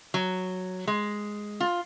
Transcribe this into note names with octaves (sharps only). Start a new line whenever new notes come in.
F#3
G#3
F4